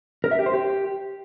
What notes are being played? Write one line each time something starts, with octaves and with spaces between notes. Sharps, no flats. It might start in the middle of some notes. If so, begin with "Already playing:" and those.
A#4
E5
G4
C5
G4